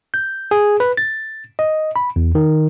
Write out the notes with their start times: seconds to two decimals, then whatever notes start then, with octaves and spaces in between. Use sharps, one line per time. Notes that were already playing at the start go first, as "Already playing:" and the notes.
0.14 G6
0.51 G#4
0.80 B4
0.97 A6
1.59 D#5
1.96 B5
2.16 E2
2.35 D#3